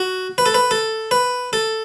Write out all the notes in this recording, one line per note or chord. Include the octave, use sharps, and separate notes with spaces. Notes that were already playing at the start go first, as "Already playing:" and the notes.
Already playing: F#4
B4
A4
B4
A4
B4
A4